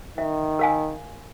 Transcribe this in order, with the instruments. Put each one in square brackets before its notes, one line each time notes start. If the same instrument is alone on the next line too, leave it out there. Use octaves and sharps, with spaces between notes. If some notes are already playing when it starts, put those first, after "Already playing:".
[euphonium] D#3 [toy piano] E5
[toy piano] A#4 F5 G#5